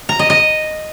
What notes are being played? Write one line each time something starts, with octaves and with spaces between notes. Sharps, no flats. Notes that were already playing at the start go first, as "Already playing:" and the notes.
A#5
D#5
D#5